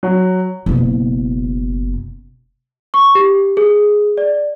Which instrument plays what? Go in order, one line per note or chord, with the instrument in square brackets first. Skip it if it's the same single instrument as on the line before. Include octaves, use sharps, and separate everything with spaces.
[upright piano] F#3
[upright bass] F#1 B2
[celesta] C#6
G4
G#4
D5